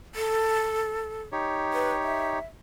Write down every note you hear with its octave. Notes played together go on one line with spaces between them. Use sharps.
A4
D#4 G4 C#5
B4
E5